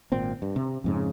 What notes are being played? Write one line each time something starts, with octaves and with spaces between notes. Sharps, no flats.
G#1 A#2 C4
G2
C3
F2 G#2 C#3